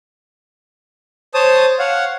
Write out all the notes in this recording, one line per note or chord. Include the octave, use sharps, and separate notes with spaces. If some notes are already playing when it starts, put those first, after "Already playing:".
C5 C#5 A5 D#6
C#5 F5 F#5